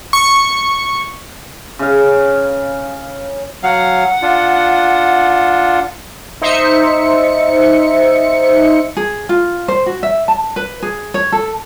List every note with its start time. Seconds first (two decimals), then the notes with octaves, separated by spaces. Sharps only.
0.13 C#6
1.79 C#3 F5
3.63 F#3 F5 F#5
4.22 D4 F4
6.41 D#4 C5 E5 C#7
8.97 G#4
9.29 F4
9.68 C5
9.86 F#4
10.03 E5
10.28 A5
10.56 B4
10.83 G#4
11.14 C#5
11.32 A4